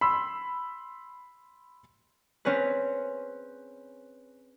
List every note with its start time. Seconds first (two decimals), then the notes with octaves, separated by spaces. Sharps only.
0.01 B5 C6 E6
2.45 C4 C#4 G#4 B4